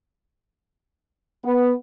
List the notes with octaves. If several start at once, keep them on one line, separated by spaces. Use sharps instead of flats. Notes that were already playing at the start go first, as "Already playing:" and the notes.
B3